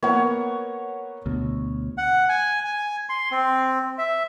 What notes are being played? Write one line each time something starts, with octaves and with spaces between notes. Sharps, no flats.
A#3 B3 C#5 F#5
D2 B2
F#5
G#5
G#5
C6
C4
E5